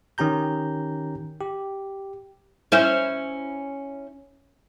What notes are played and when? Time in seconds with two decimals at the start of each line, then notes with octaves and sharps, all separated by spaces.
0.18 D#3 C#4 G4 A#5 G6
1.41 G4
2.72 C#4 E4 C5